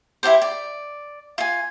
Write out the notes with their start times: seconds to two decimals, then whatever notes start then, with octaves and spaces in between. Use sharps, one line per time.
0.23 E4 F#4 G4 C5
0.42 D5
1.38 F4 G#5